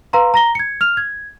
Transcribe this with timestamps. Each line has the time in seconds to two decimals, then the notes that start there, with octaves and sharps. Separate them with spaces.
0.13 B4 F5 A#5 C6
0.34 A#5 A#6 G7
0.55 G#6 C#7
0.81 F6 F7
0.97 G#6